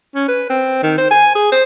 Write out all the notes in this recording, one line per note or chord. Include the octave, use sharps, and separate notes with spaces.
C#4
B4
C4
D#3
C5
G#5
G#4
C5